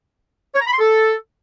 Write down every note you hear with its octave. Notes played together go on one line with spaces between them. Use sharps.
C#5
A#5
B5
C6
A4